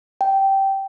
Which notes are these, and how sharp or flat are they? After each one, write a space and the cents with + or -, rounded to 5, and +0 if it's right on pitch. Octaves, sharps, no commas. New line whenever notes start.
G5 -10